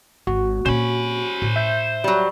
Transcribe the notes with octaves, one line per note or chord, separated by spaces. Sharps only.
G#1 F#4
A#2 C4 C#4 C5 B5
A2
E5 G6
F#3 G3